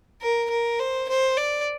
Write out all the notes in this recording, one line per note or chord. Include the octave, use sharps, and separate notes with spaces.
A#4
A#4
C5
C5
D5